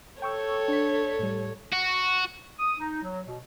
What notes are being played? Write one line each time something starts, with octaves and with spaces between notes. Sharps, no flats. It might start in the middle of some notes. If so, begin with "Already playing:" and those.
A4 C#5 G5 C#6 E6
D4 B6
A2 G3
F#4
D#6
D#4
F#3
B2